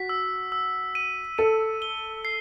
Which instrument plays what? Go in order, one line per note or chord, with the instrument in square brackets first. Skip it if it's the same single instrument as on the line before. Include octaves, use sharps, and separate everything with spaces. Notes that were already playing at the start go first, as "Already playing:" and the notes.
Already playing: [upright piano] F#4 [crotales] B6
[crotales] E6
E6
D#7
[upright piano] A4 [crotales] D#7
[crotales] G7
C7